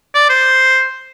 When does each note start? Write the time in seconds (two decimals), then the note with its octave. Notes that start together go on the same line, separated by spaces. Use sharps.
0.15 D5
0.29 C5